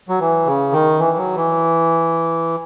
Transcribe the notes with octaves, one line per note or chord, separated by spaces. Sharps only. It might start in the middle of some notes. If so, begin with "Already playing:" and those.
F#3
E3
C#3
D#3
E3
F#3
E3